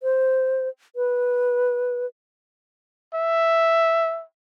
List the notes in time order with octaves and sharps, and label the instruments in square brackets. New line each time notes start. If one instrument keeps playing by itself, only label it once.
[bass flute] C5
B4
[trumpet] E5